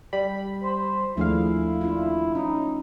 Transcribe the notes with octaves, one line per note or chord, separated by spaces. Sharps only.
G3 B5
C5
D#2 F3 A3 D4 E4 G#4 F5
D4 F4
C#4 D#4